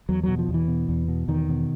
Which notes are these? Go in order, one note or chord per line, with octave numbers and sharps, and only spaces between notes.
E2 F#3
B2 F#3
F3
E2
E3
B2
E2
B2
E2 D#3
B2